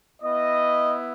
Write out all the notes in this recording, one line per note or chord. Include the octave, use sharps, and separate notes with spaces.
B3 E4 D#5